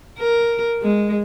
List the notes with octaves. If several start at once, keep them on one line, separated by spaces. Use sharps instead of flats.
A#4
G#3